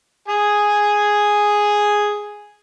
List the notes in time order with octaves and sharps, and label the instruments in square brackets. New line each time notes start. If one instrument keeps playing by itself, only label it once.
[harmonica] G#4 G#5